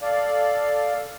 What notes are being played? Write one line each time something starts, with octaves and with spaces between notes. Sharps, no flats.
A4 D5 F5